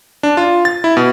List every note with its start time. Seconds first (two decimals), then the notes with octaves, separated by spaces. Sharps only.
0.23 D4
0.37 F4
0.65 A6
0.84 E4
0.97 B2